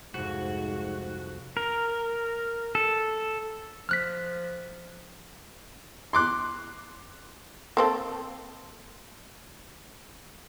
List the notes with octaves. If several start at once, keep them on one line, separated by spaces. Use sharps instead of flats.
C2 F2 G#2 F#4
A#4
A4
F3 F6 F#6 B6
C6 D6 F#6
A#3 C4 A4